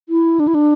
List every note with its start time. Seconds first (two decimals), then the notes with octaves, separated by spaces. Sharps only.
0.09 E4
0.40 D4
0.47 E4
0.54 D4